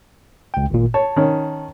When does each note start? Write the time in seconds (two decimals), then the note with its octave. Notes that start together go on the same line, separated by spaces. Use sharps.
0.54 C#2 G5
0.70 G#1 A#2
0.94 C#5 A5
1.16 D#3 C#4